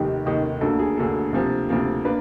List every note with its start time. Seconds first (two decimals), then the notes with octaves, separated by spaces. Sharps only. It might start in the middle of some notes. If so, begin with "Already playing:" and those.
Already playing: F1 D#2 D#3 G4
0.25 F1 D#2 D#3
0.61 D2 D3 F#3 A#3 A4
0.79 G#4
0.97 D2 D3 F#3 A#3 A4
1.33 D2 C3 F3 A#3
1.69 D2 C3 F3 A#3
2.05 A#3 D4 B4